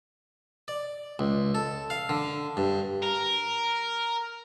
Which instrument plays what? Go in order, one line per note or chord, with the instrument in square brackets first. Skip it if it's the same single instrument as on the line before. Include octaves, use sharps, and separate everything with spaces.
[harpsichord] D5
C#2
A4
F5
D3
G2
[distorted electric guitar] A#4